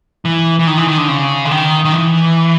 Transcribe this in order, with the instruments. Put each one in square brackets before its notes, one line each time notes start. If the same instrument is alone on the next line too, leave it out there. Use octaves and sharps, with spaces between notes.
[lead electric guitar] E3
E3
D#3
E3
D#3
D3
C#3
D3
D#3
D#3
E3